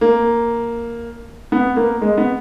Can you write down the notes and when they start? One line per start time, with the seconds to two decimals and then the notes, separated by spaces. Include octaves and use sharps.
0.01 A#3
1.52 B3
1.76 A#3
2.01 G#3
2.17 B3